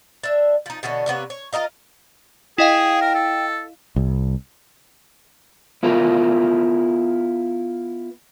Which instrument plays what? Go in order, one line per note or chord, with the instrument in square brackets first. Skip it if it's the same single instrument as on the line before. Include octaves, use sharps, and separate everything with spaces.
[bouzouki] D4 E5
F3 D#4
B2 D3 E3 C#4
C3 A#3 B3 C#5
C#5
F4 A#4 D#5 F5
[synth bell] E4 D#5 F5 [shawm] G#4 [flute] G5
[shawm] A#4
A4
[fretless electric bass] C2
[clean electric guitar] B3 E4 F4 A#4